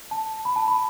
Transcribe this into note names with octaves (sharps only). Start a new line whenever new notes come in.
A5
B5
A5
B5